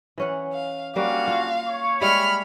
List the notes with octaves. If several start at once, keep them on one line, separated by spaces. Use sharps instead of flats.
E3 C#4 F#5
F5
G3 A#3 C#4 D4 F#4 F5
F4
C#5 C#6
G3 G#3 E4 B5 F6